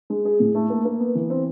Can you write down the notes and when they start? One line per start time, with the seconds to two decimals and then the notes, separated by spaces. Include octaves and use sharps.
0.10 G#3
0.25 G#4
0.40 A2
0.55 A3
0.70 A#3
0.85 A#3
1.00 B3
1.15 E3
1.30 C4